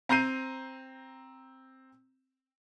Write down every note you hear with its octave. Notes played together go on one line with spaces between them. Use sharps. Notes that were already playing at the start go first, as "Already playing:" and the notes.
C4 A#5 G6 C7 D#7